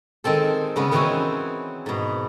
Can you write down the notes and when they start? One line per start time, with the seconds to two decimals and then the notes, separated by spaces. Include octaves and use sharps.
0.24 D#3 G#3 C4 A4
0.76 C#3 G#3 B3
0.91 D#3 E3 C4 F#4 G#4 C#5
1.86 G#2 B2